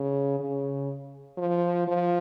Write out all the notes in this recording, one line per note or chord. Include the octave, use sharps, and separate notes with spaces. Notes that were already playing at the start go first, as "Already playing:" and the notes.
Already playing: C#3
C#3
F3
F3